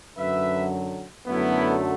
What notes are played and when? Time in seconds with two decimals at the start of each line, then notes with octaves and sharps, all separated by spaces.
0.18 F#2 D3 F#3 B4 E5
1.27 F#2 D3 F#3 A3 B3 E4